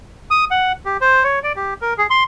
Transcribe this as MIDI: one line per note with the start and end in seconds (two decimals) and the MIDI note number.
0.31 0.45 87
0.51 0.72 78
0.85 0.97 67
1.01 1.24 72
1.24 1.39 73
1.44 1.52 74
1.56 1.74 67
1.82 1.94 70
1.98 2.07 68
2.10 2.24 84